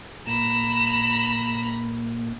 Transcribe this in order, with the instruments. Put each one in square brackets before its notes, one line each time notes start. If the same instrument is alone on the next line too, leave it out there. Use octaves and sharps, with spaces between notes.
[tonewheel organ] A#2 A#3 [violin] A#5 B5 [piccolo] E7